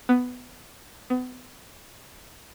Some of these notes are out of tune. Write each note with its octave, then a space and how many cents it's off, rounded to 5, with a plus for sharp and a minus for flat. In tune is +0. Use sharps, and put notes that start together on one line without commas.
B3 +10
B3 +35